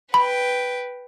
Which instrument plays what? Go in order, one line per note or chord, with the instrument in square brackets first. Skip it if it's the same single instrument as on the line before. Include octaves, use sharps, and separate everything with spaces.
[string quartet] B4 G5 [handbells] B5